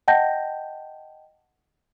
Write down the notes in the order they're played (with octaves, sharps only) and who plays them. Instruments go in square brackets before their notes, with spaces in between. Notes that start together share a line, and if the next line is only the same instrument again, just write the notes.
[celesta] D#5 F#5 G5 A5 G6 A#6